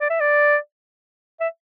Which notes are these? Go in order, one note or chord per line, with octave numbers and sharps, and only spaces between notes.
D5
E5
D5
E5